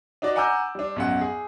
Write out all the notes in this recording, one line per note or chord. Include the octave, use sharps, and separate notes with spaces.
D4 D#4 F#4 D5
F#5 G#5 A#5 D6 E6 G6
G3 D4
B1 F#2 F#5
G#4